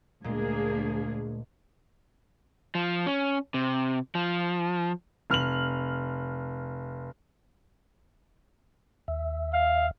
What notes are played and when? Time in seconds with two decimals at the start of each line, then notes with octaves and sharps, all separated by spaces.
0.24 D2 A#2 G#3 A#3 D4 G#4
2.75 F3
3.06 C#4
3.54 C3
4.15 F3
5.30 F1 F6 F7 F#7
9.08 D#2 E5
9.54 F5